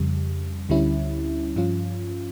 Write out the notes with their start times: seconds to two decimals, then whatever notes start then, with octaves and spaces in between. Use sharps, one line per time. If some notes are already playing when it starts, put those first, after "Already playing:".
Already playing: F2 C#3 G3
0.69 D2 D3 G3 C#4 E4
1.56 G2 F3 C#4 F4